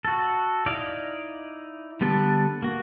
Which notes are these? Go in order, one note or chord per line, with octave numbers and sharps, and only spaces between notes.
F#4 A4
D#4 E4 D5 D#5 F5
D3 G3 B3 A4
A#3 F#4